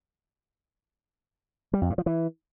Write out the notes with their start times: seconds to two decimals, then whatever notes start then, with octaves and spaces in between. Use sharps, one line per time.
1.73 G3
1.82 F2
1.90 G2
1.98 F3
2.06 E3